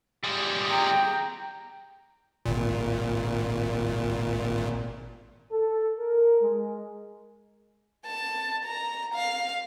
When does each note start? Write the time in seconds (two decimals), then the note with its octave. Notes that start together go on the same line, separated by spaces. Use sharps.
0.24 G3 G#3
0.69 G5 A#5
2.46 G#1 A#2
5.52 A4
5.99 A#4
6.42 G#3
8.06 A5
8.65 A#5
9.15 F5